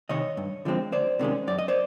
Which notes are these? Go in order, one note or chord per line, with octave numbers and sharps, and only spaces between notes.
C3 D#3 C#5 D#5
G2
D3 F3 G#3 C4
D2 C5 D5
C3 D#3 G#3 C#4
F#2 D5
D#5
C5 D5